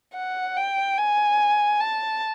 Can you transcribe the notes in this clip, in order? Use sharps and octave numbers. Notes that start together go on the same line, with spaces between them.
F#5
G5
G#5
A5